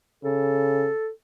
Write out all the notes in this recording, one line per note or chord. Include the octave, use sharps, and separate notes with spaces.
C#3 A4